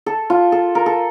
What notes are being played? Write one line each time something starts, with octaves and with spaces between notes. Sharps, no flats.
A4
F4
A4
A#4
A4